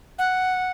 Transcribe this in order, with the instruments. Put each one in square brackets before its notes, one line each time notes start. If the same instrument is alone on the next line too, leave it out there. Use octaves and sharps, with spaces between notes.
[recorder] F#5